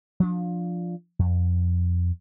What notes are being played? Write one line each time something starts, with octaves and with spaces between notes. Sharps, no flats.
F3 D4
F2